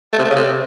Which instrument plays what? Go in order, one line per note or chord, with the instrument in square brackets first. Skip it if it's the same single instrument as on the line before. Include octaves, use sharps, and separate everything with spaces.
[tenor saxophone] A3
C3
A3
C#3
C3